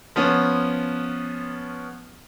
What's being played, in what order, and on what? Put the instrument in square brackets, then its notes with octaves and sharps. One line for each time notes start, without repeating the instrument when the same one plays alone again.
[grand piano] F3 B3 C#4